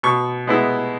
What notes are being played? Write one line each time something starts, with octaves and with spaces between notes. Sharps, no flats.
B2 C#6
G#3 B3 E4